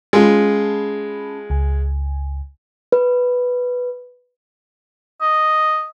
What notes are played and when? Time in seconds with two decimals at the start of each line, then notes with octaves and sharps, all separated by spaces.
0.13 G#3 C#4 F4 A5 B5
1.50 C#2 G#5
2.92 B4
5.21 D#5